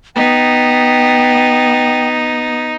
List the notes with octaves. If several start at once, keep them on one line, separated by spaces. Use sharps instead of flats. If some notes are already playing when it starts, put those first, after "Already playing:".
B3 D#4 G5